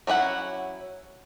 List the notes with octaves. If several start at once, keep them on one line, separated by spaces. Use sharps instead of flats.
F#3 C#4 E4 F#5